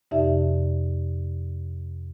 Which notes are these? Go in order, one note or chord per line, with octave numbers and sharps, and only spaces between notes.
F2 C3 D#4 G4 D5 E5